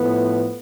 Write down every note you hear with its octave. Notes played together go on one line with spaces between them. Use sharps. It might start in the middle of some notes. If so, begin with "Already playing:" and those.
Already playing: A2 F3 B3